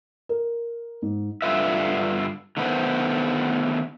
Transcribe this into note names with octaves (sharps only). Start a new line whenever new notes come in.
A#4
G#2
G2 D3 E3 F4 B4 E5
D3 D#3 A3 B3 B4 C5